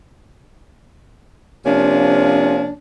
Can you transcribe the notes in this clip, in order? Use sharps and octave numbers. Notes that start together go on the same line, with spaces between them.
C3 F3 A#3 C#4 D4